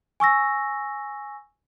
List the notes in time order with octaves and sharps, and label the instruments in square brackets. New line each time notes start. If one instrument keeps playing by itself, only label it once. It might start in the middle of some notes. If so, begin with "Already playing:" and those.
[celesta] G#5 C#6 E6 A#6